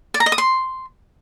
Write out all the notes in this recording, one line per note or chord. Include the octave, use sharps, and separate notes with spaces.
D5
A#5
D#5
D#6
C6